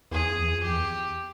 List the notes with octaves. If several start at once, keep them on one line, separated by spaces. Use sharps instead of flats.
E2 G#4
F2
E2
F2
E2 G4